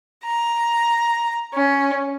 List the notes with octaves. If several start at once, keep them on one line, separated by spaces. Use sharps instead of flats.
A#5
C#4